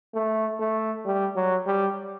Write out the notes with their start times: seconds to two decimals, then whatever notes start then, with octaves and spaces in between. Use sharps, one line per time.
0.15 A3
0.60 A3
1.06 G3
1.36 F#3
1.67 G3